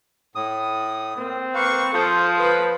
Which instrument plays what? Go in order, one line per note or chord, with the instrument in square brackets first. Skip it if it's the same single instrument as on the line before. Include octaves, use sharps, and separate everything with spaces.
[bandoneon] A2 D#6
[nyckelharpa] A#3 [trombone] C4
[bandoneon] A#3 B4 F5 [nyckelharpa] C#6
[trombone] F3 [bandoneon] F4 C5 D#6 [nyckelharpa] A4
[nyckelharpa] B4